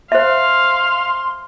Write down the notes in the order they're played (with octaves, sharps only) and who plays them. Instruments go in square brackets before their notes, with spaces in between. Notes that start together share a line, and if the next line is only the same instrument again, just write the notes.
[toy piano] C5 E5 [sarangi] F5 [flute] C6